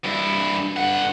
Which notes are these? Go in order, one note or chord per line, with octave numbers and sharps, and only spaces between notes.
G2 E4
G2 F#5